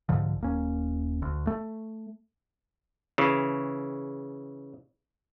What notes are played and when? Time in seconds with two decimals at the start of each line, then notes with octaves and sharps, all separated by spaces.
0.09 C2 G#2 D3 F3
0.41 D#1 A#3 C#4
1.22 D2
1.47 A3
3.18 C#3 E3